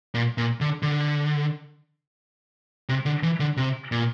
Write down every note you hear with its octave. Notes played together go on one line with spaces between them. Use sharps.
A#2
A#2
D3
D3
C3
D3
E3
D3
C3
A#2